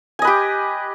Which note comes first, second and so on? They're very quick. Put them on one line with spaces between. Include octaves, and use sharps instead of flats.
G#5 D#5 B4 G4